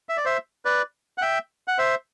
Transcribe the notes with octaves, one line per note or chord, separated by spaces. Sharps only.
E5
D5
C5 E5
B4 D5
F#5
E5 G5
F#5
C5 E5